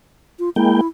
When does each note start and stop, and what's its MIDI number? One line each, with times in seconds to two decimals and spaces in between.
0.39 0.49 65
0.56 0.81 56
0.56 0.81 58
0.56 0.87 64
0.56 0.81 79